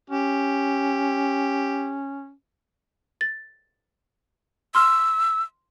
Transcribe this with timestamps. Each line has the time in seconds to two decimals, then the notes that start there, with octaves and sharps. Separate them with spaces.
0.10 C#4 G4
3.21 A6
4.75 C6 E6 F6